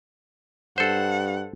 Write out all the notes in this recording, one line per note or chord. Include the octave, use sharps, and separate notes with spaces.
G2 A4 C5 F#5